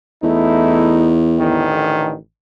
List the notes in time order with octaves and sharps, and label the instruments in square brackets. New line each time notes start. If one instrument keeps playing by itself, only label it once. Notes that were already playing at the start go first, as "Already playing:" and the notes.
[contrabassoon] E2 [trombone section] A3 D#4 E4
[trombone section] A1 D3 D#3